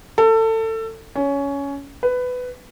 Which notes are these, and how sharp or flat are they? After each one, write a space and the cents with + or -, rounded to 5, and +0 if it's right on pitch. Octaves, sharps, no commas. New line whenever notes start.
A4 +25
C#4 +15
B4 +15